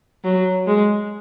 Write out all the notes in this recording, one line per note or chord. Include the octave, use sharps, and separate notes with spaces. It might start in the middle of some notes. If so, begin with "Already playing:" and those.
F#3
G#3